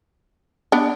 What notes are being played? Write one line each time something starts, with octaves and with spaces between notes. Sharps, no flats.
B3 D4